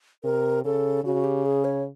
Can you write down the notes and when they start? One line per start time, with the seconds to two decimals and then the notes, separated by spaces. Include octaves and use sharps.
0.24 C3 A#4
0.65 C#3 A4
1.04 C#3 F#4
1.24 G4
1.45 G#4
1.64 C#5